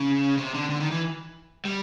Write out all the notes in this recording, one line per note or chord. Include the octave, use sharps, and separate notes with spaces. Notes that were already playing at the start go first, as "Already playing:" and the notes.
Already playing: C#3
C3
D3
D3
D#3
E3
G3